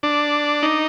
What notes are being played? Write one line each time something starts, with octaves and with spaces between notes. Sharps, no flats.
D4
D#4